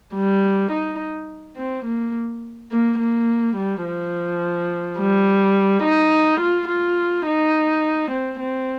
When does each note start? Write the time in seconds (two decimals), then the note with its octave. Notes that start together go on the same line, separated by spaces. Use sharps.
0.15 G3
0.72 D#4
1.57 C4
1.85 A#3
2.72 A#3
2.99 A#3
3.57 G3
3.84 F3
4.98 G3
5.83 D#4
6.41 F4
6.68 F4
7.26 D#4
8.12 C4
8.40 C4